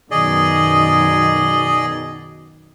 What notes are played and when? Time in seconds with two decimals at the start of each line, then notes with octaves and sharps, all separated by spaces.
0.11 F#2 B2 D#3 G#4 D5 D#5